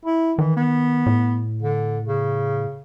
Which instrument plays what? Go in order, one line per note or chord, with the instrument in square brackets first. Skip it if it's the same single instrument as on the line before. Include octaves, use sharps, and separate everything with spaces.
[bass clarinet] E4
[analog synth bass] D#3 [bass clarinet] E3
[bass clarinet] B3
[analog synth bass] A2
[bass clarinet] D3
C#3